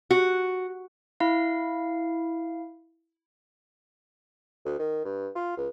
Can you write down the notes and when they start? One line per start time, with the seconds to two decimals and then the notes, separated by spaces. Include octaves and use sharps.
0.11 F#4
1.20 E4 F5
4.65 D2
4.79 D#3
5.05 G2
5.35 F4
5.57 C#2